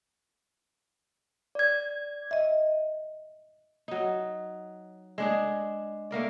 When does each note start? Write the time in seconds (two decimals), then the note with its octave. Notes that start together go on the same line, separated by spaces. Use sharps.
1.55 D5 G#6
2.31 D#5 E5
3.88 F#3 D#4
5.18 G#3 D4 G#4
6.11 A3 A#3 A#4 D5